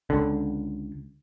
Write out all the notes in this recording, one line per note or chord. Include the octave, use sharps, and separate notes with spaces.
C#2 D3